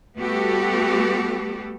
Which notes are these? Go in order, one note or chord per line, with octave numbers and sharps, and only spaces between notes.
G3 A3 B3 F#4 G4 A4